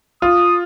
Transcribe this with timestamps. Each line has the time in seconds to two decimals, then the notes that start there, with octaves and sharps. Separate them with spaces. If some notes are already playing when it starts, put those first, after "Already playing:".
0.22 F4 D#6